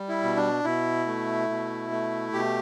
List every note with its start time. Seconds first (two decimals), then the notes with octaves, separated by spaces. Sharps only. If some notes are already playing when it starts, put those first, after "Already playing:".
Already playing: G3
0.09 E4
0.23 B2
0.36 D4
0.64 B2 E4
1.07 A3
1.49 B2
1.91 A3
2.33 B2 G4